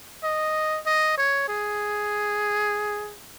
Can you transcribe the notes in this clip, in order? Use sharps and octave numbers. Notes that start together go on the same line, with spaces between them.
D#5
D#5
C#5
G#4